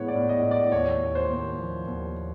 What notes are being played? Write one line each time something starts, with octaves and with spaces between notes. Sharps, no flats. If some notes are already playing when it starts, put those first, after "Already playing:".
Already playing: A2 E3 G#3 B3 C#5 F#5
D5
A2
D#5
A2
D5
D#2 C#5
D#2
C5
D#2
F3
D#2